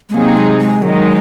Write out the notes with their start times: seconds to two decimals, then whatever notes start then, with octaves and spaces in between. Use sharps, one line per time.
0.09 G#3
0.14 C3 F#3 A#3 C4 D#4 G#4
0.37 G#3
0.59 G#3
0.82 D#3 F#3 G#3 D#4